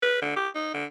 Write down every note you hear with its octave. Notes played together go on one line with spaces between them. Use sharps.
B4
D3
G4
D#4
D3